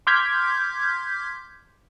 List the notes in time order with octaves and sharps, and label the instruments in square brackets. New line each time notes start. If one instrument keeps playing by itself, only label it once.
[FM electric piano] C6 D6 F6 G6 G#6 B6